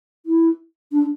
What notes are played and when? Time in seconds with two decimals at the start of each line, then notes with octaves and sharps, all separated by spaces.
0.26 E4
0.92 D4